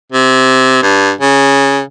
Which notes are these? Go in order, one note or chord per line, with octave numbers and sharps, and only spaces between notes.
C3
G2
C#3